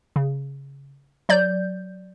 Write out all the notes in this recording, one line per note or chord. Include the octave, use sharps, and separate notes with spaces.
C#3
F#3 D5 G6